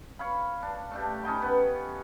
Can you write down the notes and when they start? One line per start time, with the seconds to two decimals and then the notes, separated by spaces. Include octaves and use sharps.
0.19 C#5 F5 B5
0.63 D4
0.91 A3 D4 G4
1.23 C#4 D#4 G5 B5
1.42 B3 C#4 B4